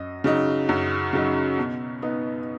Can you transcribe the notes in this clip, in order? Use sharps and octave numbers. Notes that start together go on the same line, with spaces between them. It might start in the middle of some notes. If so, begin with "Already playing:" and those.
Already playing: F#2 D#5
C#3 F#3 D#4
F#2
C#3 F#3 D#4
B2
B3 D#4